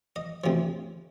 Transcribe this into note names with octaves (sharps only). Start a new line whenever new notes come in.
D#5
D2 C3 F3